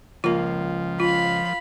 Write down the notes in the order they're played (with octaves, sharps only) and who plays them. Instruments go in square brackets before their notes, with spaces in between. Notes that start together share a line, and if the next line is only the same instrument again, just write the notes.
[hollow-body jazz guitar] C#2 A#3 [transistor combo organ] F3 [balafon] F4
[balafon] F4 [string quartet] F5 B5